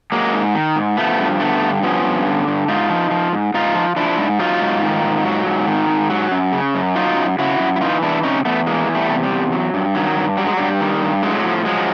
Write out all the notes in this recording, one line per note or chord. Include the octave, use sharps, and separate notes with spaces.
F#3 G#3 A#3
G#2
D#3
G#2
F3 A3 B3
G2
D3 A3 B3
G2
F3 B3 C#4
G2
D3
G2
G#2 D#4 F4
F3
F3
G#2
G#2 D#4 F4
F3
F3 D4 E4
G#2
F#3 D#4 F4
G#2
D#3
G#2
F#3
G#2
D#3
G#2
F#3
F#2
C#3
F#2
F#3 D#4 F4
F#2
C#3 E4 F#4
F#2
E4
E3 D#4 F4
E2 D4 E4
C3 C#4 D#4
E2 A3 B3
E3 G#3 A#3
E2
G3 A3
C3
G3
E2
F#3
G2
D#3 F#3
G2
F#3 G3
G#3
G2 G3
D#3
G2
A2 F#3 G#3
F3
F3 F#3 G#3